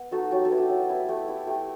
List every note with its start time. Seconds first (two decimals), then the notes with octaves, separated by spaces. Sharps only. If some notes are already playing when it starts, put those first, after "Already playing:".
Already playing: B3
0.11 D#4 F#4 A4
0.31 F#3 G4
0.45 A4
0.51 B3 E4
0.58 G4
0.69 F#3
0.89 B3 E4
1.08 A3 G4
1.28 E4
1.47 A3 G4